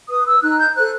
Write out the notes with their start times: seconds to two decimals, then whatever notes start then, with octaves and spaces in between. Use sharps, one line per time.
0.09 B4 D#6
0.26 E6
0.41 D#4 F#6
0.59 G6
0.75 A4 C5 F#6